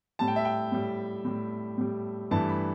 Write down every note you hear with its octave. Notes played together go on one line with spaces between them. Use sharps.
A2 G3 A5
G5
E5
G5
A2 G3
A2 G3
A2 G3
G2 E3 A3 A5
B5